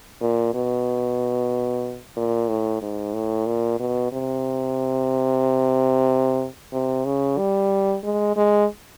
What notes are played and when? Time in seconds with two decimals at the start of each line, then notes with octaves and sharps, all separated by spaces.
0.21 A#2
0.54 B2
2.16 A#2
2.48 A2
2.82 G#2
3.14 A2
3.46 A#2
3.79 B2
4.12 C3
6.72 C3
7.05 C#3
7.38 G3
8.04 G#3
8.36 G#3